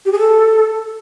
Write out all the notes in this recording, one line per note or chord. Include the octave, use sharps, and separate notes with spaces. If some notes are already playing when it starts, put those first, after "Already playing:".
G4
G#4
A4